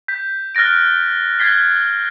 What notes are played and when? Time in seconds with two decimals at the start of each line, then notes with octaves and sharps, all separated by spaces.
0.08 G6 B6
0.55 F6 F#6 A6 A#6 D7
1.39 F#6 G#6 A6 B6 C7 G7